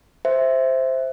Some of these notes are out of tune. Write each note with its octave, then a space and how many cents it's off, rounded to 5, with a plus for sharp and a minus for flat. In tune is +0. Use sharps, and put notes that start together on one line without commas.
C5 +0 E5 +0